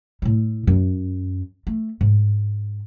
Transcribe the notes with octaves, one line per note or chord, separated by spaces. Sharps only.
A2 E4
F#2
A3
G#2